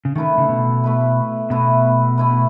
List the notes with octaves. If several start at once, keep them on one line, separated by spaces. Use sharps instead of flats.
C#3
D#3 A3 E4 B4
C#3
B2
A3 E4 B4
B2 A3 E4 B4
A3 E4 B4